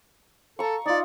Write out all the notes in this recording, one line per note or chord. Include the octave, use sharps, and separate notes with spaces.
A4 A#5 C#6
D#4 F4 D5